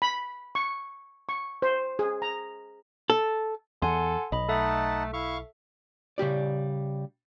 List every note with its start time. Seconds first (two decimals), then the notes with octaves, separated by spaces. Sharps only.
0.02 B5
0.55 C#6
1.29 C#6
1.62 C5
1.99 G#4
2.22 A#5
3.10 A4
3.82 E2 A4 F#5 G#5 C6
4.32 B1 D#5 B5
4.49 A3 D#4 A4 E5 F#5 A5
5.13 E4 F5 C#6 F6
6.18 C#3 G3 G4 D5